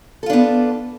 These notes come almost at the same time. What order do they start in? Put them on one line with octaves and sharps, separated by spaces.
A4 F4 D4 B3